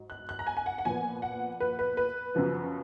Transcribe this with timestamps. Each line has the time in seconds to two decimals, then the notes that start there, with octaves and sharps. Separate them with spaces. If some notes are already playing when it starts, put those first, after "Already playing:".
Already playing: G#2 F#3
0.10 F#6
0.29 F#6
0.39 A#5
0.47 G#5
0.57 G#5
0.66 F#5
0.78 F#5
0.85 A#2 F3 B3 G#5
1.22 F#5
1.60 B4
1.79 B4
1.97 B4
2.35 F#2 C#3 F3 B3